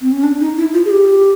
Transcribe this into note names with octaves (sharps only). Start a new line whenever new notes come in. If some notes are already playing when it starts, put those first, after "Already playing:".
C4
C#4
D4
D#4
E4
F4
G#4
G4